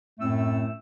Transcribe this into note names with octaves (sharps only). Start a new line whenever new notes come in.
F#2 A2 A3 C4 E6